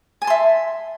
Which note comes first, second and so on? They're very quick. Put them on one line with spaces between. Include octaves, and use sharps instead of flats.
G#5 A5 C6 E5